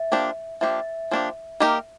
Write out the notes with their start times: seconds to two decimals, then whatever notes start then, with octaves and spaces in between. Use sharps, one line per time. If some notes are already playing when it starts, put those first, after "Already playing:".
Already playing: E5
0.12 F3 A#3 D4 G4
0.61 F3 A#3 D4 G4 E5
1.11 F3 A#3 D4 G4
1.60 A#3 D#4 G4 A#4